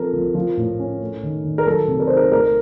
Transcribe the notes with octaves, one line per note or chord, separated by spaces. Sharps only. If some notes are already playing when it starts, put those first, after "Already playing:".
Already playing: F3 C4 A4 A#4
F3
F3
A2
C#4
A3
D#3
D#3
A#4
F#3 A4
C3
A#4
D#4 C5
A#4
A3 A#4